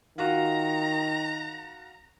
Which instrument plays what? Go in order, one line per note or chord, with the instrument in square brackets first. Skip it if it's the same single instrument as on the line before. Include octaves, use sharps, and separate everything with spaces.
[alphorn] D#3 [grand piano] F4 F#4 [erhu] A#5